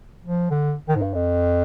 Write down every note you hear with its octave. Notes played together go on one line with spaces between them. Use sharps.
F3
D3
D#3
G#2
G2
F2